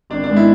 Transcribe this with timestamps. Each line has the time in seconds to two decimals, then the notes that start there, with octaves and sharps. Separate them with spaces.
0.10 G#1 D4
0.24 D4
0.29 G#2 G#3 B3
0.36 E4